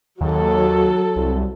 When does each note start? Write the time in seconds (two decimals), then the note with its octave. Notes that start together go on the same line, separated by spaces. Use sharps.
0.21 D#2 F#3 A4
1.16 C2